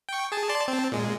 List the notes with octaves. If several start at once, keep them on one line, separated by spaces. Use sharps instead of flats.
G5 C#6
G#4 A5
D5 A5 C6
C4 A5
A#2 G#3